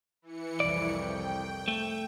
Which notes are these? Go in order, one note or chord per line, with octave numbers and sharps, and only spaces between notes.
E3 C#7
C2 F2 D5
G5
A3